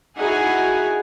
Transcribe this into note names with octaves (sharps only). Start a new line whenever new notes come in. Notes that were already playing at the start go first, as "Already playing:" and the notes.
D#4 E4 F#4 G#4 F#5 G#5